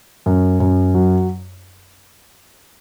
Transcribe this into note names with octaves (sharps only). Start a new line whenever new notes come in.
F#2
F#2
F#3